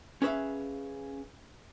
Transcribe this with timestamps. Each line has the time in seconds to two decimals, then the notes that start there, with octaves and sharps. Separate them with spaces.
0.22 C#4 G#4 B4 C5 E5 F5